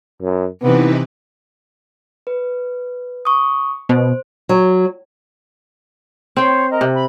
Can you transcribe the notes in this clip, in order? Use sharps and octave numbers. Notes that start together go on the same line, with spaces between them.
F#2
C3 E3 B3 D#4 E4 B4
B4
C#6 D#6
B2 C5
F#3
C4 C5 C#5 G5
A#4 D#5
C3
B5